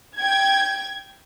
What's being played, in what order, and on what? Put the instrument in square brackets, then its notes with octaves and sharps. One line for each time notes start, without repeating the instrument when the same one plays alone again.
[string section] G5 G#6